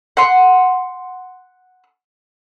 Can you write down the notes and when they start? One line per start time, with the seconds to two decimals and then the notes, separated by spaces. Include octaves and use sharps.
0.17 F#5 C6